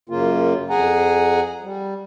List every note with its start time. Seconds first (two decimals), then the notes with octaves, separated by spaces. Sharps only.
0.09 F#2 C#3 A#3 F4
0.70 F2 G#4 F#5 G#5 A#5
1.62 G3